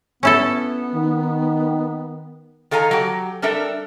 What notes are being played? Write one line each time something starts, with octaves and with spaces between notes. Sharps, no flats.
B3 C#4 E4 A4
D#3
D#3 A4 F5 G#5 A#5
F#3 G4
G3 D4 A4 A#4 E5